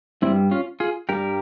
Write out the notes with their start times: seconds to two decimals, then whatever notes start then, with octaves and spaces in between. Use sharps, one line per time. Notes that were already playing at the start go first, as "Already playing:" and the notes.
0.22 G2 G3 C4 E4
0.51 C#4 F4
0.80 F4 G#4
1.09 G2 G3 G4 A#4